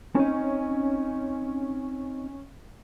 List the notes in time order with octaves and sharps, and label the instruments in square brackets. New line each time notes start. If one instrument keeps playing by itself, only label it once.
[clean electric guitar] C4 D#4 [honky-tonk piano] C#4